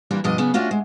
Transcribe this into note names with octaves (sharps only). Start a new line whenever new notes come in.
E3 G3 A#3 D4 F4
G2 B2 F3 D4 D#5
C#3 F#3 B3 D4
A3 C#4 D4 F4 F#4
G#3